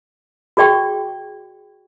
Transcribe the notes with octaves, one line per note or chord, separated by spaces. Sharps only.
F#4 G#4 D5 G5 C#6